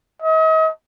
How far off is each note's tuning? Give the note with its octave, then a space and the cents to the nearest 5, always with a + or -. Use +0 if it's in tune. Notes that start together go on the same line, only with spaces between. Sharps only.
D#5 +40